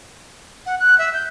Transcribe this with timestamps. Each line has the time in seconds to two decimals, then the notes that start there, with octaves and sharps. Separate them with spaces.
0.66 F#5
0.79 F#6
0.98 E5
1.13 G6